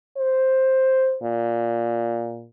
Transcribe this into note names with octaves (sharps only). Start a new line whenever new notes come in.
C5
A#2